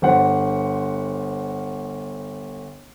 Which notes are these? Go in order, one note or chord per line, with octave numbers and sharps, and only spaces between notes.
G1 C5 F#5